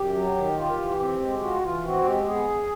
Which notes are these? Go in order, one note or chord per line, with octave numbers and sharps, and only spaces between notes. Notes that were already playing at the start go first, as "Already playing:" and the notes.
Already playing: F#2 G4
F#3
D#3
F4
E3
C4
G#3
F4 F#4
E3 F4
C4 F#4
G#3 G4
B3 G#4